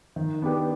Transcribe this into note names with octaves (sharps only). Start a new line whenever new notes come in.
D#3
B3 D4 G4 B4